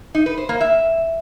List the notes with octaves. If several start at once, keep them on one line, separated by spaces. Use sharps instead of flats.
D#4
B4
C5
A#3
E5